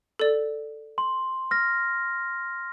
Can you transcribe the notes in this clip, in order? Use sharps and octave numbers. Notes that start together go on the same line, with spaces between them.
A4 D5
C6
F6 A#6